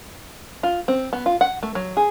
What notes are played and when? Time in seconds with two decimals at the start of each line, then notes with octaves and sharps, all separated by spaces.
0.63 F4
0.88 C4
1.13 B3
1.26 F4
1.41 F#5
1.63 A3
1.75 F#3
1.97 G#4